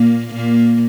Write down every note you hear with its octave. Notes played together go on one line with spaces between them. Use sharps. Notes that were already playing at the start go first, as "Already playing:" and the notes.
Already playing: A#2 A#3
A#2 A#3